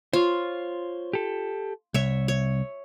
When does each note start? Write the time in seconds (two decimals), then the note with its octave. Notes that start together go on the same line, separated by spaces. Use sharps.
0.13 F4 C5 C#5
1.13 G4 A4
1.94 C2 C#5 E5
2.28 C#5